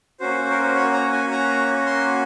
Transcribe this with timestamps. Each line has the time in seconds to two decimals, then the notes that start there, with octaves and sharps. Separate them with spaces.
0.20 A#3 C#4 F#4 C5
0.50 A#4
0.63 C5
0.75 C#5
0.93 A#5
1.12 G#5
1.31 A#5
1.86 C6